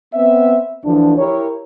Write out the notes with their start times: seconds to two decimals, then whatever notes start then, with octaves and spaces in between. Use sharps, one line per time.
0.14 B3 C4 E5
0.84 D2 D3 E3 F3 D4
1.18 E4 G4 A#4 C#5